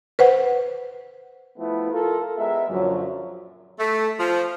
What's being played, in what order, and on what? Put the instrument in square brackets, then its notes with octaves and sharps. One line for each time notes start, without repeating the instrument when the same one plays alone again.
[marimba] B4 C5 F#5
[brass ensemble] F3 A3 B3 E4
F4 A4 A#4
G#3 B3 A#4 E5
F#2 A#2 D3 F3 F#3
[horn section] A3
F3